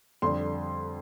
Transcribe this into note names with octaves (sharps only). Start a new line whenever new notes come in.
F2 D3 G3 C6